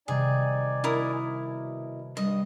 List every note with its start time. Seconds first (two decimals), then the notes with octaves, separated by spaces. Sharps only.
0.08 C3 D#3 G3 D#4 G#4 D5 G#5
0.84 E4 F#4 A#4 D#6
1.40 B2
2.17 G2 G3 D#5